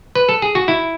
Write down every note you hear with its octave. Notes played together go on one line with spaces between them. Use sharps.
B4
A4
G#4
F#4
E4